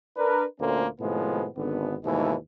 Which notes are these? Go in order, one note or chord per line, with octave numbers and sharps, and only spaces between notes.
D4 A#4 B4
D2 A#2 A3 A#3 C#4 C5
A2 C3 D#3 F3 G#3 B3
G#1 D3 B3
D#2 G#2 B2 E3 G#3 A3